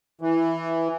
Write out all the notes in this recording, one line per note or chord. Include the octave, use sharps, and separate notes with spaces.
E3